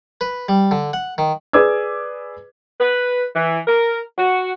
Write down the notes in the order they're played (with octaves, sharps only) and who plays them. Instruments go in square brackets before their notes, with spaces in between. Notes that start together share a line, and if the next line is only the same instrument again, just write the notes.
[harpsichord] B4
G3
D3
F#5
D#3
[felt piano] G#4 B4 D5 D6 E6 G#6
[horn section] B4
E3
A#4
F#4